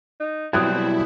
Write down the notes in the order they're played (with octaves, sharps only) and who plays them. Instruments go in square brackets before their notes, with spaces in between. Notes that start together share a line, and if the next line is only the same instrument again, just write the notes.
[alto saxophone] D#4
[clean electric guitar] B2 F#3 G3 [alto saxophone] C4 [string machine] E4 [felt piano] D#6 F#6 G#6